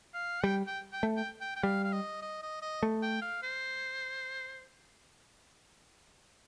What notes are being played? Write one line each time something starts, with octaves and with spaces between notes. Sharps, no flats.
F5
G3 G5
G5
G5
A3
G5
G5
G5
G3 F5
F5
D#5
D#5
D#5
D#5
A3
G5
F5
C5